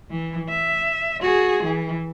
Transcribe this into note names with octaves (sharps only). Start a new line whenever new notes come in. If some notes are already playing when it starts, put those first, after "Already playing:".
E3
E5
F#4 G#4
E3